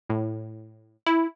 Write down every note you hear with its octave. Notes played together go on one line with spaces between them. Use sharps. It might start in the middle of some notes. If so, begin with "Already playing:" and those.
A2
E4